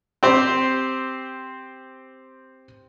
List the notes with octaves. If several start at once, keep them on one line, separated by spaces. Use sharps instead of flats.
C4 G4 C5